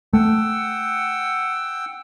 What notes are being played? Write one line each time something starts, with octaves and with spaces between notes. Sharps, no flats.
A3 F#5 G5 E6